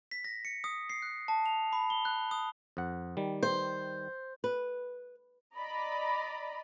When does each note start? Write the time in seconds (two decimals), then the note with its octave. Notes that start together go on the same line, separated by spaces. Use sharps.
0.11 B6
0.24 A#6
0.45 C#7
0.64 D#6
0.90 C7
1.02 F#6
1.28 A5
1.46 F7
1.73 B5
1.90 G7
2.05 F#6
2.31 D#6
2.77 F2 F#5
3.17 D#3 G3
3.43 C5
4.44 B4
5.57 D5 D#5 A#5 B5